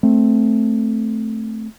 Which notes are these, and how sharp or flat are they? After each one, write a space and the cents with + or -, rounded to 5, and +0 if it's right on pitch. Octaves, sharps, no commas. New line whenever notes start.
A3 +0 C4 +0